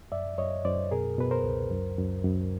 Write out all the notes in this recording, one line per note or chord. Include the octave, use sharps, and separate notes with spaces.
F#2 D5 E5
F#2 C#5 D#5
F#2 C5 D5
B2 G#4 A#4
B2 B4
A#4 C5
C#2
F#2
F#2
F#2